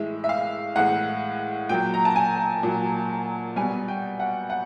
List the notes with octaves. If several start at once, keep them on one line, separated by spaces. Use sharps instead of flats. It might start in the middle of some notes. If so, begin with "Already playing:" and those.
Already playing: A2 E3 G#3 E5
E5
F5
A2 E3 G#3 F#5
A#2 F#3 G5
A#5
A5
G#5
A#2 F#3
B2 G3 G#5
G5
F#5
F#5